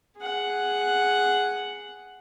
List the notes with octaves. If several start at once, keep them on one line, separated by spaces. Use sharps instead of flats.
G#4 F#5